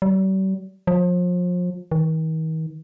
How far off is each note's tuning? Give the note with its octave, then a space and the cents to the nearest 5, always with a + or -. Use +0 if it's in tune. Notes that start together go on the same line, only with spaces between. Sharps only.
G3 -45
F3 +35
D#3 +40